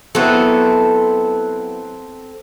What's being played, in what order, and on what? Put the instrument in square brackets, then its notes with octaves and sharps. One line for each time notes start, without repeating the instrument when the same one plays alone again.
[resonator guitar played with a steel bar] F#3 B3 E4 [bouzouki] C4 A4